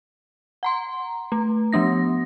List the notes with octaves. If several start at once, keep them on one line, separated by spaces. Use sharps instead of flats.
F#5 A#5 C6
A3
F3 B3 D4 A#6